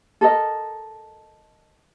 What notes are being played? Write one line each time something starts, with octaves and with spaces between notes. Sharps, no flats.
A4 A#4 D#5